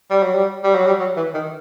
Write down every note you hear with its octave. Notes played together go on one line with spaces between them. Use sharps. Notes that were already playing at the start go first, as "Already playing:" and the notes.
G3
F#3
G3
G3
F#3
G3
F#3
E3
D#3